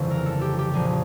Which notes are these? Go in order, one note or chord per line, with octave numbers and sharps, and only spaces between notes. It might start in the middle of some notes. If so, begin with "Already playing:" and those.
Already playing: G1 F2 C#3 E3
A#4
A4
G4
G4
A#1 A#2 F3 G#4